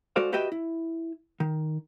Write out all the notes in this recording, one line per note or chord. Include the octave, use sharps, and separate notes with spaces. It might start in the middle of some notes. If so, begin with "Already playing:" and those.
G#3 F#4 A4 C5 D5 F5
F#4 G4 B4 D#5 E5 G5
E4
D#3